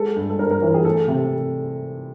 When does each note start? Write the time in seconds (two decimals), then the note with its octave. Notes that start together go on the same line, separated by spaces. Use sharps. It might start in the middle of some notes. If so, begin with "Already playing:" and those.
Already playing: G#3 A4
0.16 G2
0.30 A4
0.39 G2 A#4
0.51 A#4
0.62 E3 A#4
0.74 G#4
0.85 A3 A4
1.08 C3